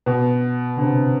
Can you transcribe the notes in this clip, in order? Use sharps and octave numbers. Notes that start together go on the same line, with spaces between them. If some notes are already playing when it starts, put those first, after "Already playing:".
B2
D3
C3